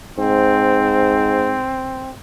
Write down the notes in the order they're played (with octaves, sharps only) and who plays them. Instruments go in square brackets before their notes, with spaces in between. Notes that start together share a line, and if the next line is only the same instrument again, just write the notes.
[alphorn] G#2 [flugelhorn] C4